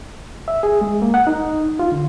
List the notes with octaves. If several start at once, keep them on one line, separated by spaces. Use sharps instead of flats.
E5
G#4
G#3
A#3
F#5
D#4
F4
D3